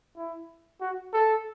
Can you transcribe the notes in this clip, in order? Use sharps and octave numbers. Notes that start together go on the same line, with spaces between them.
E4
F#4
A4